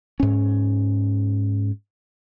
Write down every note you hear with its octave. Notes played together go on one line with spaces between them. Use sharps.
G#2 C#4